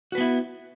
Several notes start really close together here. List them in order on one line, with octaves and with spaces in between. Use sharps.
F#4 B4 B3 E4